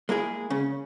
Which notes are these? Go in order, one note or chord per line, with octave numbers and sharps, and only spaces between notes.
G#3 A#3 E4 G#4
C#3 C#4